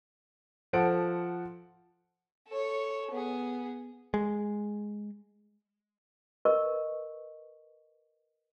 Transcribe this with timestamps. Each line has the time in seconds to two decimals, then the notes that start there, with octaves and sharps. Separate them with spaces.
0.73 F3 A4 C5 F#5 D7
2.48 A4 C#5
3.11 B3 G#4
4.14 G#3
6.45 A#4 B4 D#5 C#6